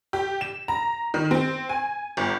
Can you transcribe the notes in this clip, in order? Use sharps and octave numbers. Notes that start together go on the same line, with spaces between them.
G4
E7
A#5
D#3
C4
G#5
G1